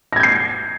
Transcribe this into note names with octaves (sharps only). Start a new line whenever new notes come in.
G6 G#6 A#6 C7